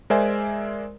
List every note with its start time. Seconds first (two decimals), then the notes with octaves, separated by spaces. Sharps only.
0.10 G#3 A#4 C5 D5 E5 G#5